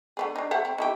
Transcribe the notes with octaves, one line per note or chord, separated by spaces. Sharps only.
D3 B3 G#4
D4 D#4
C5 E5 F#5
C4
D#4 E4 G4